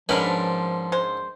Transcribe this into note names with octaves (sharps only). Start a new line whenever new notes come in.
G#2 B2 F3 C#4 D4 A#4 B4 B5
G#3 C5